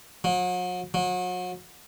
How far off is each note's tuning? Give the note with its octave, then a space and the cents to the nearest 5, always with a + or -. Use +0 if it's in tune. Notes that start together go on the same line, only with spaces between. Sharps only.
F#3 -40
F#3 -35